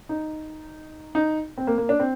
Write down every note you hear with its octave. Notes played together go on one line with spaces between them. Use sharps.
D#4
D#4
C4
A#3
A#3
D4
C4